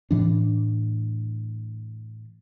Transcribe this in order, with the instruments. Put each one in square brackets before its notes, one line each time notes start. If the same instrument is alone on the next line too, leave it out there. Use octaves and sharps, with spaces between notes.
[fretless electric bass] A2 E3 D4